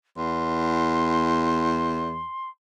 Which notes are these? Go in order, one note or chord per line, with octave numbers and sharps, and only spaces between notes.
E2 C6